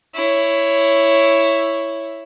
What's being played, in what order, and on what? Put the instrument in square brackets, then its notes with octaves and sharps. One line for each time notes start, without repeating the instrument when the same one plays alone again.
[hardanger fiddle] E4 C#5